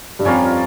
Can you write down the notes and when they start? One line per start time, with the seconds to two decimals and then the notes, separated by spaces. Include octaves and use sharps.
0.19 G2
0.25 F2 G3 C#4 F4 A#4